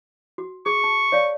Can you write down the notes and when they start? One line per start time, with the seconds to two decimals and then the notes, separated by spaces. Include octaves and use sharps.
0.38 F#4
0.66 G#4 C#6
0.84 A5
1.12 C#5 D5 F5